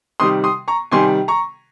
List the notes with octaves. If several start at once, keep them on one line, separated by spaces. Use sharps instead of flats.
C3 D#3 G3 C6 D#6
C6 D#6
A#5 C#6
C3 D#3 G3 G#5 C6
A#5 C#6